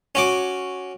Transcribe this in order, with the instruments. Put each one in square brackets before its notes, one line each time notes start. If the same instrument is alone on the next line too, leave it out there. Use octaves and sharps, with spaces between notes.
[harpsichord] C#4 F#4 D6